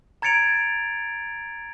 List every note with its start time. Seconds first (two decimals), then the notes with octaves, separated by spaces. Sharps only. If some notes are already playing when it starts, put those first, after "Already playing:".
0.22 A#5 G#6 A6 C#7 D7 F7